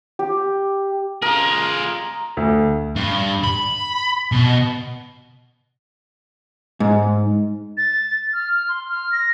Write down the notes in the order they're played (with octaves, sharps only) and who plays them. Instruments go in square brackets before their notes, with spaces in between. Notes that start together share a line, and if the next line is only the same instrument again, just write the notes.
[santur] G4
[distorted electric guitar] F4 G#4 [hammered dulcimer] A#4
[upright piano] D2
[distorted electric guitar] G2
B5
B2
[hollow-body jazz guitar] G#2
[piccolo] A6
F6
C6
F6
A#6